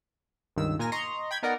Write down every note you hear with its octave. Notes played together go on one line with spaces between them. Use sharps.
C#2 G2 D#3 E6
A#2 A#4 G#5 A#6
D#5 A#5 C6 C#6
G5 B5 G#6
B3 D#4 A#4 D5 D#5 F#5